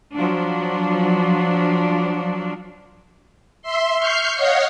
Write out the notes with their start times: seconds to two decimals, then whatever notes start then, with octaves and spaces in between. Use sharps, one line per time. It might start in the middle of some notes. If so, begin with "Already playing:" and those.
0.13 F3 F#3 D4
3.62 E5 C6
3.97 C#6 F6 G6 C7
4.35 C#5 D#5 F5 F#5